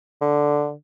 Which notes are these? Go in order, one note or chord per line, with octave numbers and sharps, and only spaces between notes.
D3